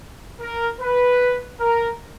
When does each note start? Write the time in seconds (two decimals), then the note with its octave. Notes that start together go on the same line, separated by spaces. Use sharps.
0.40 A#4
0.80 B4
1.60 A#4